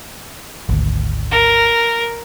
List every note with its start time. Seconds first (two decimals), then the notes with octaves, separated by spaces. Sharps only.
0.69 G#1 D2
1.31 A#4